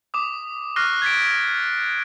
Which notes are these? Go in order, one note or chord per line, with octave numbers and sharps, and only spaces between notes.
D6 D#6
C#6 D6 F6 F#6 A#6 C7
G#6 A6 B6 D7